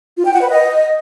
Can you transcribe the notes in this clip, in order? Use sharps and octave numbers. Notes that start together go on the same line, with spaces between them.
F4
G5
F#5
B4
D#5